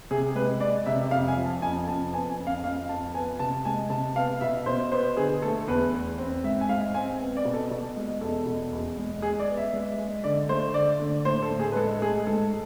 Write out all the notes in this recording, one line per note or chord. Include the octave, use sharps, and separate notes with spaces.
C3 G#4
G#3 B4
G#3 D5
C3 E5
E5
F2 F5
G#5
F3
A5
F2 G#5
F2 A5
B3 G#5
G#5
F2
F5
F2 F5
F2 A5
B3 G#5
C3 A5
G#3 G#5
C3 A5
B3 F5
B2 E5
B2 C5
B3 C5
D3 G#4
A3 A4
E2 B4
E2
C4
G#2 E5
G#5
G#3 F5
C4 G#5
B3
D5
B2
A4
B2
G#3
E2 A4
B2
E2
G#3
G#3 G#4
D5
B3
E5
G#3
G#3
D3 D5
A3 C5
D3 D5
D3
A2 C5
A4
A2
G#4
B4
G#3 A4
G#3 G#4
G#2 A4